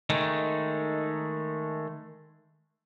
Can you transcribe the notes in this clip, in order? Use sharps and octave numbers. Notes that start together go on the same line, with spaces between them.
D#3 G#3 A3